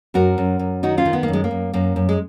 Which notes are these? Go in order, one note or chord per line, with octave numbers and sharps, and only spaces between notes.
F#2 F#4 A#4
F#2
F#2
D#3 D#4 F#4
C#4 F4
D#3
B3
A#3
F#2
G#3
A#3
F#2
F#2 A#3
F#2
G#3